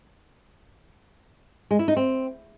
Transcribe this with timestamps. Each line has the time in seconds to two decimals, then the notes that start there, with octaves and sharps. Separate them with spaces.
1.71 G#3
1.79 E4
1.88 D#4
1.97 C4